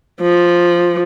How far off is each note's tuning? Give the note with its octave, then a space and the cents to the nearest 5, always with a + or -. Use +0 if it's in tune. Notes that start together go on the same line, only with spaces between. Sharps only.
F3 +0